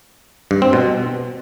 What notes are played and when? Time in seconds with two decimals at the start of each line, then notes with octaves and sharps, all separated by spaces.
0.51 G2
0.62 C4
0.73 B2